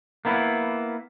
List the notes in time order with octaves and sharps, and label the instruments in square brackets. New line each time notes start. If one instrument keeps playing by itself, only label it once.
[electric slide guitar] A#3 B3 E4